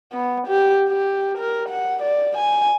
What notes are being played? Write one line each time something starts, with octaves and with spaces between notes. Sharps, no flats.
B3
G4
G4
A#4
F#5
D5
G#5